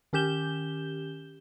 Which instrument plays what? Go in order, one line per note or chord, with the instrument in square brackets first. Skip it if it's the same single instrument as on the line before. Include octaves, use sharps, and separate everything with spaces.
[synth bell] D#3 C#4 G4 G6 E7 G7